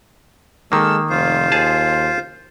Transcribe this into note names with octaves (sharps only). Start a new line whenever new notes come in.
D#3 G#3 A#3 A4 E6
F1 F4 C5
D#2 G#4 A5